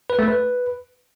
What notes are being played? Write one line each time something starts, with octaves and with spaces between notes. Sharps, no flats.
B4
A3
B4